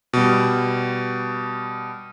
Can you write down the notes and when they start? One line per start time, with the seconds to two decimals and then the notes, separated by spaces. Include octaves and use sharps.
0.13 B2 G3